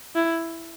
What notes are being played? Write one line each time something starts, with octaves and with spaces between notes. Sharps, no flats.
E4